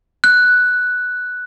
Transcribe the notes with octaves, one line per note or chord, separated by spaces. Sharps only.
F#6